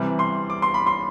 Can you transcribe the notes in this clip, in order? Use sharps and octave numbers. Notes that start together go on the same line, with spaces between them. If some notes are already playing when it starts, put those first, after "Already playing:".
Already playing: C3 E3 G3
C6
D6
C6
B5
C6